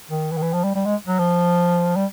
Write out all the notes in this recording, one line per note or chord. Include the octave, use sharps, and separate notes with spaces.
D#3
E3
D#3
E3
F3
G3
G3
G#3
F#3
F3
G3